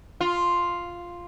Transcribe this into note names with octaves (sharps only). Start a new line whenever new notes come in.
F4